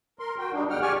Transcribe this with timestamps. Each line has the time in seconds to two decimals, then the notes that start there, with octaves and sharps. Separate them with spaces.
0.19 A#4 C6
0.38 F#4 G5
0.53 G3 D4 D#4
0.70 E2 C#3 F#5 G5 F6
0.82 G4 D5 G#5 C#6 F6